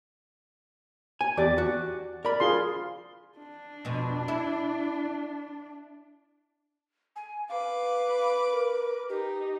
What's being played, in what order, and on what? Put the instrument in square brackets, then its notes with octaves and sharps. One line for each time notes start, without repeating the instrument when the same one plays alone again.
[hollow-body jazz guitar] G#5
[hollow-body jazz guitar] E2 [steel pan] G4 D5 D6
[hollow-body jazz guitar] F#4
[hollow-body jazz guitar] A#4 B5 [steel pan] D5
[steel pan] F4 G#4 C6
[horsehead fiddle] D4
[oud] F2 B2
E4
[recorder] G#5
[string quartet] B4 D6 [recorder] F5
[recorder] A#4
[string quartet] D#4 [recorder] G4